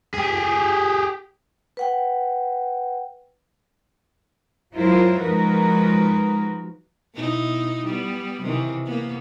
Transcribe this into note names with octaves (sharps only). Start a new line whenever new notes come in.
G4 G#4
B4 F#5 G5
F#3 E4 F4 A#4 C5
F3 G#3 D#4 F#4 A#4 B4
B2 D#4 E4
G3 B3
C3 D#3 E3
A#3 B3